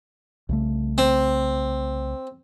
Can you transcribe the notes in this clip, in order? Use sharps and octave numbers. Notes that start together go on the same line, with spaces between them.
C2 C#3 A3
C4